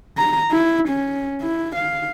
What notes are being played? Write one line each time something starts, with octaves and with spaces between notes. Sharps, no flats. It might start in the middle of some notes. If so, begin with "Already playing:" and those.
A#5
E4
C#4
E4
F5